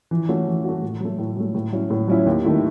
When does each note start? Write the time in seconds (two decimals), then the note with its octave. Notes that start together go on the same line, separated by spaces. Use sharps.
0.11 E3
0.29 A3 C#4 F#4
0.47 E3
0.65 A3 C#4 F#4
0.82 A2
1.01 F#3 A3
1.19 A2
1.36 F#3 A3
1.55 A2
1.72 F#3 C#4 E4
1.90 A2
2.08 F#3 C#4 E4
2.26 D#2
2.44 D#3 A3 E4